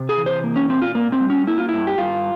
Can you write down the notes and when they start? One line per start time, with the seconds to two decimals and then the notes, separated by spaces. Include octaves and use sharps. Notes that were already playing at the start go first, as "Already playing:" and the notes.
Already playing: C3
0.09 G#4
0.17 E3
0.26 C5
0.44 A#3
0.56 C#4
0.69 A#2 C4
0.82 F4
0.95 A#2 A#3
1.12 C4
1.20 G3
1.30 C#4
1.47 A#3 E4
1.58 F4
1.69 G2 E4
1.87 G4
1.98 G2 F4